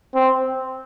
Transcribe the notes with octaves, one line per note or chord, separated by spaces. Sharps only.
C4